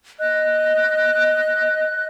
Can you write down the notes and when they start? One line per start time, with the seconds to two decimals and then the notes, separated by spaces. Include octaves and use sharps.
0.19 D#5 F#6